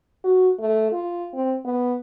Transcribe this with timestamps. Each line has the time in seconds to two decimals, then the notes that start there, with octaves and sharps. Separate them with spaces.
0.24 F#4
0.59 A3
0.92 F4
1.34 C4
1.65 B3